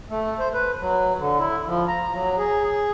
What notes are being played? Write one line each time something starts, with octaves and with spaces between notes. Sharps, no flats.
A3
C5
B4
F#3
D3
E4
F3
A#5
F#3
G#4
G#4